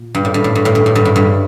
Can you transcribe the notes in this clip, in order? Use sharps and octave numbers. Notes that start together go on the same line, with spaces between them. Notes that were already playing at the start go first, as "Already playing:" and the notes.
Already playing: A#2
G2
A2
G2
A2
G2
A2
G2
A2
G2
A2
G2